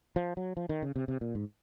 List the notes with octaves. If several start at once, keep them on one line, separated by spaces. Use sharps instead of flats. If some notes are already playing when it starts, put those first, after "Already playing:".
F3
F#3
F3
D#3
C#3
C3
C3
A#2
G#2